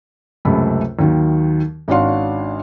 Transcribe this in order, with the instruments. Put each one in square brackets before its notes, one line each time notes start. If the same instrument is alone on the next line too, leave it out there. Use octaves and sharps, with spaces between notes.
[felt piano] C#2 F#2 C3 A3 B5
D#2 D#3 F#3
G#1 C#4 D4 F#4 F5 C6